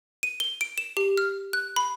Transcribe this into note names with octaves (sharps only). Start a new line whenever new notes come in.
D#7
G7
D7
E7
G4
F6
F#6
B5